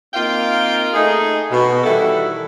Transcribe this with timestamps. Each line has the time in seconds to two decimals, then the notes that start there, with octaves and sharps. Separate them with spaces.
0.14 A#3 C4 D#4 F4 F5 G5
0.94 A3 D#4 G#4
1.50 B2
1.84 D#3 E3 G3 E4 F#4 A4